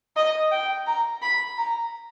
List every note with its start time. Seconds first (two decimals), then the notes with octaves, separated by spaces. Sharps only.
0.16 D#5
0.51 G5
0.87 A#5
1.22 B5
1.57 A#5